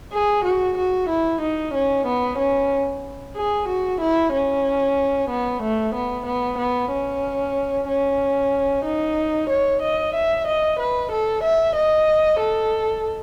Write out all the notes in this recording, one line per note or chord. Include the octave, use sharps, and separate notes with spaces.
G#4
F#4
F#4
E4
D#4
C#4
B3
C#4
G#4
F#4
E4
C#4
B3
A3
B3
B3
B3
C#4
C#4
D#4
C#5
D#5
E5
D#5
B4
A4
E5
D#5
A4